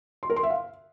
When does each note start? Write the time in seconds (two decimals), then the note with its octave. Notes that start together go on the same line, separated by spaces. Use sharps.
0.23 C6
0.30 A#4
0.36 C6
0.43 E5
0.50 F5